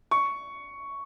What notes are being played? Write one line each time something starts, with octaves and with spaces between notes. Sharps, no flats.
C#6